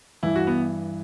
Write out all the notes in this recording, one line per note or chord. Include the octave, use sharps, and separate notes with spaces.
G2 E3 E4
F#4
B3